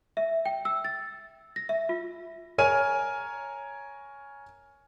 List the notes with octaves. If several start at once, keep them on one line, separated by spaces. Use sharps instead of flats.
E5
G5
E6
A6
A#6
E5
F4
A#4 C#5 G#5 F6 D#7